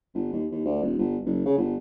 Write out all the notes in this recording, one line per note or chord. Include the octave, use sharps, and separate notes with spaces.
G1
D#2
D#2
D2
D#1
G1
F#1
C#3
G1